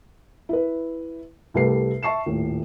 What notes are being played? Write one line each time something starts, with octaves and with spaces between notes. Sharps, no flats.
E4 B4
C2 G3 A3 G4 B4 C7
E5 A5 C#6 C7 E7
D#1 A2